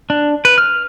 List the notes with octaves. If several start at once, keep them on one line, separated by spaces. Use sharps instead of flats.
D4
B4
F6